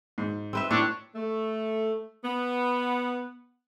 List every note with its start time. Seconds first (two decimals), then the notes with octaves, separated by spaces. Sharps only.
0.18 G#2
0.53 C4 B4 E5
0.71 A2 D4 C#5
1.15 A3
2.23 B3